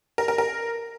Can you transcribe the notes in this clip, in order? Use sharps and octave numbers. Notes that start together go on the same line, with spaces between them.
A#4
A#4
A#4